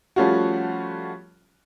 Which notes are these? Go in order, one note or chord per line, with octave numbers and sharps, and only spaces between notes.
F3 G3 A3 C#4 F4 F#4